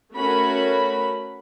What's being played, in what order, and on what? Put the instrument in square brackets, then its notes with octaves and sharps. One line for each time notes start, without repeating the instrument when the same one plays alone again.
[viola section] A3 C#4 F#4 A#4 B5